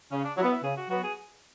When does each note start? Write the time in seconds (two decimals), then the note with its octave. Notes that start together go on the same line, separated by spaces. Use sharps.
0.11 C#3 C#4
0.24 D4
0.37 F#3 E4
0.43 B3
0.51 E4
0.63 C#3 G#4
0.77 F#4
0.89 F#3 B3 F#4
1.03 G#4